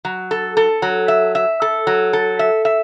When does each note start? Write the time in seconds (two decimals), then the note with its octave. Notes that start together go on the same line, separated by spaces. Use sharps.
0.05 F#3
0.31 A4
0.57 A4
0.82 F#3
1.08 E5
1.35 E5
1.62 A4
1.87 F#3
2.13 A4
2.39 E5
2.65 E5